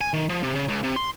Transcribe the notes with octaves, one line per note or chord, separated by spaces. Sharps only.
G#5
D#3
F3
C3
C#3
C#2
C3
C6